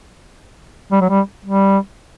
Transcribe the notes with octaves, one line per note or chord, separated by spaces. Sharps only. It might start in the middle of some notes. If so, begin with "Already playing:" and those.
G3
F#3
G3
G3